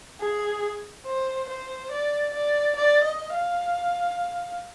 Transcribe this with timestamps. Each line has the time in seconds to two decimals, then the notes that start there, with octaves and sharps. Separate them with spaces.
0.21 G#4
1.06 C5
1.49 C5
1.92 D5
2.34 D5
2.76 D5
3.04 D#5
3.33 F5